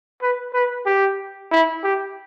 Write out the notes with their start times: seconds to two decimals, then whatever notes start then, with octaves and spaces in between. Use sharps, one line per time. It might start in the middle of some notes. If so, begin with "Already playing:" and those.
0.22 B4
0.54 B4
0.86 G4
1.52 E4
1.84 G4